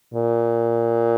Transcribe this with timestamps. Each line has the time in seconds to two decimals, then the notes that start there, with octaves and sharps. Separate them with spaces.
0.14 A#2